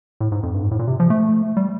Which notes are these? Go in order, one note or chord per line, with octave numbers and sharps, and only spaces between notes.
A2
G#2
F2
G2
G#2
A2
A#2
C3
F3
A3
G3